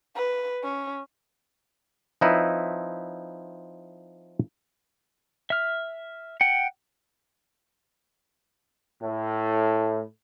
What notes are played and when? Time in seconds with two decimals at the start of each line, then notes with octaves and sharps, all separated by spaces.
0.15 B4
0.63 C#4
2.21 F3 C4 D#4 E4 B4 C#5
5.50 E5 F6
6.41 F#5 G5
9.02 A2